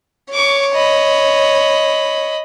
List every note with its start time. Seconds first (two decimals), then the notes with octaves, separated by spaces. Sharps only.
0.33 C#5 C#6 D6
0.73 D#5 B5